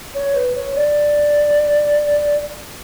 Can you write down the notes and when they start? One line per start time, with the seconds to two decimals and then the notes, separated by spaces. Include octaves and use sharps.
0.15 C#5
0.35 B4
0.55 C#5
0.76 D5